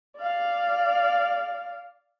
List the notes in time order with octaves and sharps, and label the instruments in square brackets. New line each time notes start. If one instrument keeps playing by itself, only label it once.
[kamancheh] D5 F5